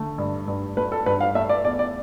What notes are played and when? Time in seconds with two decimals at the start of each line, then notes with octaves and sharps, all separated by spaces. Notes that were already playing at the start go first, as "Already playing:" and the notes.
Already playing: D3 A3
0.18 G2
0.48 G2
0.77 A3 B4
0.92 A4
1.06 G2 B4
1.21 F5
1.35 A3 E5
1.49 D5
1.64 E2 D5
1.79 D5